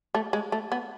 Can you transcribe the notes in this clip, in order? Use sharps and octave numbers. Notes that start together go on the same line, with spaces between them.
A3
G#3
A3
B3